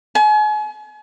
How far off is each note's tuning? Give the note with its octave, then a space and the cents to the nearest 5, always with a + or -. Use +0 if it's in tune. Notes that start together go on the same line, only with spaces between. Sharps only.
G#5 +40